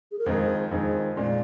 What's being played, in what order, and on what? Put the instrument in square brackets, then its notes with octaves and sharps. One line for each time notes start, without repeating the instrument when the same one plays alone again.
[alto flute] G#4
A#4
[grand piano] F2 D#3 G#3 D#4 G#4 [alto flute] C5
[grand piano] F2 D#3 G#3 D#4 G#4 [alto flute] C5
[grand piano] A#2 G#3 [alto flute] D5